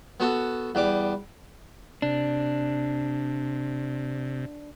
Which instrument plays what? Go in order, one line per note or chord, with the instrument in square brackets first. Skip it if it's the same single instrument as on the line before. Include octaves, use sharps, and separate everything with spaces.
[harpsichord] B3 F#4 A4
E2 G3 D6
[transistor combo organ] C3 [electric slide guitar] D4